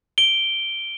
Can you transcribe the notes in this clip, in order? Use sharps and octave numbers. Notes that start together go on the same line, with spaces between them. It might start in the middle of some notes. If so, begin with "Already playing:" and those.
D7 G7